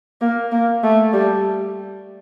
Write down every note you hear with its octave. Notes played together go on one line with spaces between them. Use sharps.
A#3
A#3
A3
G3